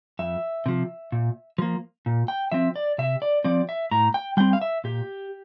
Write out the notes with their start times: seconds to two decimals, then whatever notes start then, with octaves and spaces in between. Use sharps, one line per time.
0.19 F2 E5
0.66 C3 F3
1.12 A#2
1.58 F3 A#3
2.06 A#2
2.28 G5
2.52 F3 C4 E5
2.76 D5
2.98 C3 E5
3.22 D5
3.44 F3 C4 D5
3.69 E5
3.91 A2 A#5
4.14 G5
4.37 G3 C4 G5
4.53 F5
4.62 E5
4.84 A#2 G4